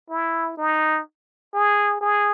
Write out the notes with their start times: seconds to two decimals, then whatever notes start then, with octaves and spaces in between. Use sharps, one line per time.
0.10 E4
0.57 D#4
1.54 G#4
2.01 G#4